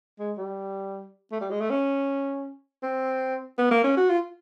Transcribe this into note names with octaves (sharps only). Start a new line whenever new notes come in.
G#3
G3
A3
G3
G#3
A3
C#4
C4
B3
A#3
C#4
F#4
F4